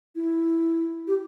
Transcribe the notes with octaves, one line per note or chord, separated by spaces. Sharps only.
E4
G4